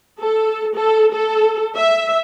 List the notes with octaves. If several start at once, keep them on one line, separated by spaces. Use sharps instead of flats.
A4
A4
A4
E5